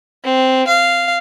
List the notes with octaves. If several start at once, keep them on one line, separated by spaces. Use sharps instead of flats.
C4
F5